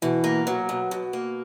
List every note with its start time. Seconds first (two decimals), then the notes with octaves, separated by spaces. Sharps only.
0.02 B2 E3
0.24 A#3
0.47 F#3
0.69 B2
0.91 B2
1.13 A#3